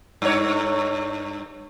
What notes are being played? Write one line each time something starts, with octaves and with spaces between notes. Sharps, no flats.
G2 C#5